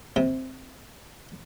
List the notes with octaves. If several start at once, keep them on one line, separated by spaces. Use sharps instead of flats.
C3